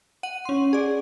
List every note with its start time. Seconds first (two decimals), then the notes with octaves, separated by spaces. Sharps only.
0.23 F#5 D#7
0.45 C#4 C6
0.73 G#4 D5